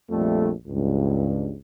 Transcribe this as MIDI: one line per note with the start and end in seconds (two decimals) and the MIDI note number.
0.11 0.50 34
0.11 0.50 41
0.11 0.50 55
0.11 0.50 57
0.67 1.54 37
0.67 1.54 43